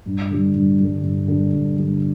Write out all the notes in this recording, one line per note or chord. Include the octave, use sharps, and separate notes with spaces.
G2
D3 G3
G2
D3 G3
G2
D3 G3
G2
D3 G3